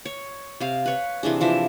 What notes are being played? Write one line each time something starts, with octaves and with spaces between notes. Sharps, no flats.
C#5
C3 F5
B4 C#5
C3 E3 D4 G#4
E3 F3 E5